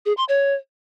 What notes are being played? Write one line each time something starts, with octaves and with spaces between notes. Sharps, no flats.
G#4
C6
C#5